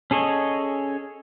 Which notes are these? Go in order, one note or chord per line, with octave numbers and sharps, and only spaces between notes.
C#4 G#4 A4 C#5 D#5